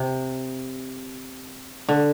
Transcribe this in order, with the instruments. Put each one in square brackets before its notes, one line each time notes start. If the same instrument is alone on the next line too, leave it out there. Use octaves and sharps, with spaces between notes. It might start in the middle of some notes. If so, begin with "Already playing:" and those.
Already playing: [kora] C3
D3